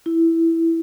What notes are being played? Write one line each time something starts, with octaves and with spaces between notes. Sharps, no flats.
E4